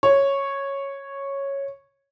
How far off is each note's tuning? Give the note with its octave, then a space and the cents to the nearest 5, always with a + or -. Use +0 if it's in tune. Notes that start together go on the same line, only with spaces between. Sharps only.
C#5 -5